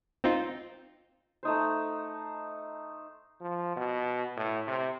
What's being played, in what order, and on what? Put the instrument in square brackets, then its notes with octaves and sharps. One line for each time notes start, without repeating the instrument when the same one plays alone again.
[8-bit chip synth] C4 D#4 F4
[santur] A3 D#4 C5
[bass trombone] F3
B2
A2
C3